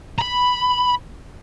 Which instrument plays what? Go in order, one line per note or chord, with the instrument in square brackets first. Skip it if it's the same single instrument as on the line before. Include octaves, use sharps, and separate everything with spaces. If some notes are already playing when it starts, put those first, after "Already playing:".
[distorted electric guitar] A#5 B5